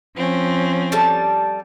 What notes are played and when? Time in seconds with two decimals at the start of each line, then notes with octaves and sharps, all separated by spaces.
0.15 F3 C4 C#4
0.92 G3 A4 A5